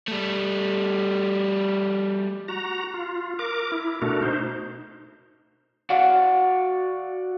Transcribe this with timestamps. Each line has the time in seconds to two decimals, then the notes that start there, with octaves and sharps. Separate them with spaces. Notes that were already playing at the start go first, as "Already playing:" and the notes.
0.08 G3 A3
2.48 F#4 A#5
2.94 F4
3.39 A#4 D6
3.72 E4
4.02 B2 A3 D4 F#4 A#4
4.22 D#4 C5
5.90 F#4 D5 F5 F#5